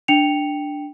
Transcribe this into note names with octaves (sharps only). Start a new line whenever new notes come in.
D4 G5 C#7 F7